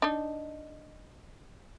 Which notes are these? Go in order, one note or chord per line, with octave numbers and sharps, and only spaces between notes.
D4 D#4